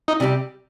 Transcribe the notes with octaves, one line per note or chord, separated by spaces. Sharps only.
D#4
C3 G3 D4 G4